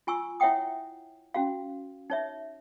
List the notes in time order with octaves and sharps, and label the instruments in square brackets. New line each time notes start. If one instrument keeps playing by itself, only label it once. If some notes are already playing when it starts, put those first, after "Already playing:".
[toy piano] F4 G#5 C#6 E6
E4 C#5 E5 F#5 G5 D#6
C#4 F#4 F5
D#4 C#5 E5